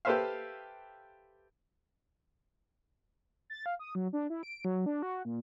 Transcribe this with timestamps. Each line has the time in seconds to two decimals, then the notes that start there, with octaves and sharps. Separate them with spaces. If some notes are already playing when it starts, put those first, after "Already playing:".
0.05 G4 A4 B4 C5 E5 F5
3.50 A6
3.66 F5
3.79 D#6
3.95 F#3
4.13 D4
4.30 E4
4.43 D7
4.65 F#3
4.86 D4
5.02 F#4
5.25 A#2